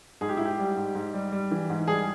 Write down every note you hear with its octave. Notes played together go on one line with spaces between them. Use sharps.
G#2 G#4
G4
G#2 E4
G4
G3
G#2
G#2
G3
G3
E3
G#2
G3 G#4